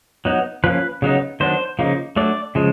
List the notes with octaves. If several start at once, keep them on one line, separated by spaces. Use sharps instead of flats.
F#3 B3 D#4
F3 A#3 C#4 B4
C#3 F#3 B3 D#4
D#3 F#3 B3 D4 C5
C#3 F3 A#3 D#4
F#3 A3 D4 D5
C#3 F3 G#3